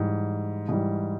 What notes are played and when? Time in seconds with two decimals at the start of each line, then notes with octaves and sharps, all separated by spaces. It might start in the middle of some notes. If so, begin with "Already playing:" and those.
Already playing: G#2 E3 G3
0.69 G#2 E3 G3